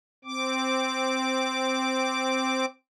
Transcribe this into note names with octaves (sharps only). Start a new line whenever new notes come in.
C4 D6